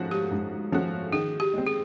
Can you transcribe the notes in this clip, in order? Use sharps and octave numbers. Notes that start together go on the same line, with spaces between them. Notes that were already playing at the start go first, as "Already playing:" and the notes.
Already playing: G#2 F3 A3 C#4 F#4
G4
G#2
F3 A3 C#4 F#4
D#3 G#4
G4
G#3 C4
G#4